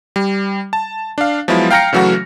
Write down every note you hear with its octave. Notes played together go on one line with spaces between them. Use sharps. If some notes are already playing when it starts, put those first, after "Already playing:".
G3
A5
D4 F5
F3 F#3 G#3 B3 E4 F4
F5 G5 A#5 F6 A#6 C#7
C#3 E3 F#3 A3 F#4